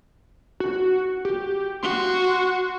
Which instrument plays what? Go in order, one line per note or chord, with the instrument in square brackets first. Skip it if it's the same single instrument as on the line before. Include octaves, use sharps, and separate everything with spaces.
[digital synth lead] F#4
G4
[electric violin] F#4 [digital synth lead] C6